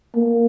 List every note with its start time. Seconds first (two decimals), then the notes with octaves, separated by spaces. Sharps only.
0.15 A#3